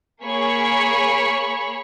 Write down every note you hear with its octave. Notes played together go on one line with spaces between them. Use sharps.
A#3 G#4 C#5 B5 C#6